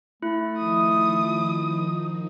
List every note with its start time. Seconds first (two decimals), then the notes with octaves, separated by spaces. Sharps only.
0.22 A3 E4
0.57 D#3 F3 D#4 D#6